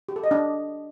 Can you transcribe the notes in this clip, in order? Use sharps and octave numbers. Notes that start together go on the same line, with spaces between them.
G4
A4
D#5
D4